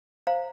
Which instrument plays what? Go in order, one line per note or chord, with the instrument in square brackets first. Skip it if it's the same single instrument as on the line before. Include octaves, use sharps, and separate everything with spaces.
[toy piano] C5 F5 A#5